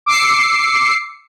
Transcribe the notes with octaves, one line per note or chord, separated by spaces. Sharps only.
D6 E6 C7 C#7